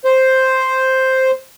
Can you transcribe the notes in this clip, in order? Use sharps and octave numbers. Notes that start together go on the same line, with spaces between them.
C5